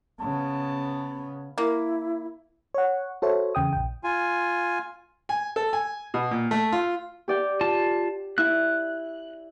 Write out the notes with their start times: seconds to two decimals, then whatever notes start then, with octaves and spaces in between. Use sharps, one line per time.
0.20 C#3 B3 A5
1.58 A#3 E4
2.74 C#5 F#5
3.22 F#4 A4 C5 C#5 E5
3.55 E2 C#3 G5 D#6
3.73 A#1 G5
4.04 F4 G#5
5.29 G#5
5.56 A4
5.73 G#5
6.14 B2
6.31 A#2
6.51 A3
6.72 F4
7.28 G4 D5 G5
7.61 F4 A5
8.38 E4 F#6